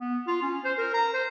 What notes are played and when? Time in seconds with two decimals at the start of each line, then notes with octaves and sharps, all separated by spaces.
0.01 B3
0.27 F4
0.42 C#4
0.64 C5
0.78 A#4
0.94 A#5
1.14 C5